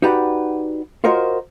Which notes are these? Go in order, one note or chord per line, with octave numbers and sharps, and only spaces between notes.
D#4 F#4 G4 B4 D5 F#5
F4 F#4 A#4 C5 C#5 D#5